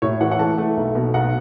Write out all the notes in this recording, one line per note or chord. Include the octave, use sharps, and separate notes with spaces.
A2 C#5
E3 F#5
F#5
A3 A5
A3
B1
B2
B1 F#5